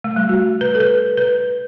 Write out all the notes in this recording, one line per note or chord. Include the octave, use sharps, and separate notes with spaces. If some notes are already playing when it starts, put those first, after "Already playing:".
A3
G3
F#4
B4
A4
B4
B4